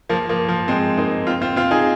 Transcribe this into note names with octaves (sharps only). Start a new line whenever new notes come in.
F3 A#3
F3 A#3
F3 A#3
G#3 C4
A#3 D#4
C4 F4
C4 F4
C4 F4
D#4 G#4